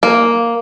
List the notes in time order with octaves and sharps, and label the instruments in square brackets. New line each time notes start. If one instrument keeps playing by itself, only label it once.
[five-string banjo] A#3